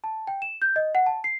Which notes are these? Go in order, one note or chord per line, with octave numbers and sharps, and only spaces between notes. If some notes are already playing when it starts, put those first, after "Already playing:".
A5
G5
E7
G6
D#5
F#5
A5
C7